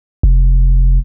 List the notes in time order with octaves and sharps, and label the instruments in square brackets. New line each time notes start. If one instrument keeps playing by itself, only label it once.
[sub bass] F1